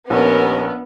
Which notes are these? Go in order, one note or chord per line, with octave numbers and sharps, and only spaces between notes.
A#1 D#2 B3 C#4 A#4